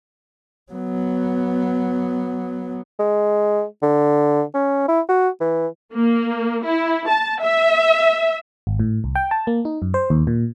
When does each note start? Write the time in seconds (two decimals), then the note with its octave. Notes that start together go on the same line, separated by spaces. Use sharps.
0.72 F#3 B3
2.99 G#3
3.82 D3
4.54 C#4
4.88 E4
5.09 F#4
5.40 E3
5.93 A#3
6.65 E4
7.08 A5
7.41 E5
8.67 G#1
8.79 A2
9.04 C2
9.15 G5
9.31 A5
9.47 A#3
9.65 D#4
9.82 F#2
9.94 C5
10.10 D#2
10.27 A#2